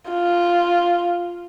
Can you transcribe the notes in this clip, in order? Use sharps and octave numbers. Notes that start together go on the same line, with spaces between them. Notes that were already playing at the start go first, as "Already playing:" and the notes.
F4